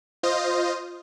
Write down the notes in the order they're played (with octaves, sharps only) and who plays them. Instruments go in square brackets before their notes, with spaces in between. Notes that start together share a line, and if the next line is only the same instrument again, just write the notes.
[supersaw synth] F4 C5 D#5